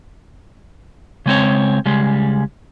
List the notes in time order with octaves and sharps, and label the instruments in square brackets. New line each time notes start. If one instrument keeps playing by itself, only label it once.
[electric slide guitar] C#3 G#3 C4 C#5
C#3 G3 G#3